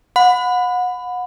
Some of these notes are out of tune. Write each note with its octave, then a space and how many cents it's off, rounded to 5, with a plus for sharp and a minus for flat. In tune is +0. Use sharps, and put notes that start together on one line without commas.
F#5 -30 B5 +20